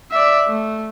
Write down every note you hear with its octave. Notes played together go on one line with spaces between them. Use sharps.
D5 E5
A3